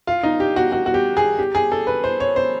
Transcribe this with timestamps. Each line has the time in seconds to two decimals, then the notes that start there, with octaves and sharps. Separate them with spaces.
0.07 F4
0.23 D#4
0.40 G4
0.56 F#4
0.72 F#4
0.86 F#4
0.94 G4
1.17 G#4
1.39 G4
1.55 G#4
1.72 A4
1.87 B4
2.04 C5
2.20 C#5
2.36 C5